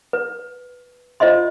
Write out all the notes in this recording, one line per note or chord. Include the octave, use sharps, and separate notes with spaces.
B4
F4 C5 D#5 E5 C6